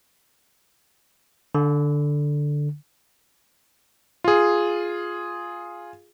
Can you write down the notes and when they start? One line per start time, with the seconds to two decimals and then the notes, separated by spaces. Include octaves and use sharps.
1.55 D3
4.24 F4 G#4